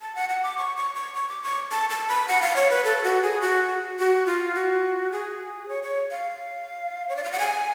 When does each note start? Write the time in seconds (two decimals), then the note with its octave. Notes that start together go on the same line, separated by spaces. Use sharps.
0.01 A5
0.15 F#5
0.29 F#5
0.43 D6
0.57 C#6
0.77 C#6
0.95 C#6
1.14 C#6
1.29 D6
1.43 C#6
1.71 A5
1.90 A5
2.08 B5
2.28 F#5
2.42 F5
2.56 C#5
2.70 B4
2.84 A4
3.04 F#4
3.23 G#4
3.41 F#4
3.99 F#4
4.26 F4
4.55 F#4
5.12 G#4
5.68 C#5
5.83 C#5
6.11 F5
7.09 C#5
7.16 D5
7.24 F5
7.32 F#5
7.39 G#5